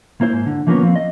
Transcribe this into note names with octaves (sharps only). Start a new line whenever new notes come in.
A#3 E4 C5
G#2
D3
E3 F3 A#3 B3 C#4 A#4
F3 C4
D#5